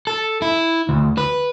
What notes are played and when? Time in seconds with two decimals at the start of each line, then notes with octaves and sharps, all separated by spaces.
0.07 A4
0.42 E4
0.89 D2
1.18 B4